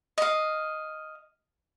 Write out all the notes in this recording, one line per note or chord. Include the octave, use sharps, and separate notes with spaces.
D#5 F5